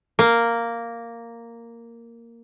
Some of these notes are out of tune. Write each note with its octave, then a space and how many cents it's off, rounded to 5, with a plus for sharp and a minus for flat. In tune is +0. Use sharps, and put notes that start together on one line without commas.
A#3 -5